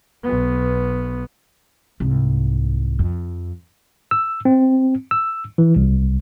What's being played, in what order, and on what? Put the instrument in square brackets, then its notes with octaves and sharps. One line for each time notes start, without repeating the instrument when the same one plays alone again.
[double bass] B1 B3
[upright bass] C2 G#2
F2
[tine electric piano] E6
C4
E6
E3
C2